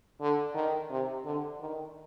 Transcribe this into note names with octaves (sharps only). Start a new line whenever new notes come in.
D3
D#3
C3
D3
D#3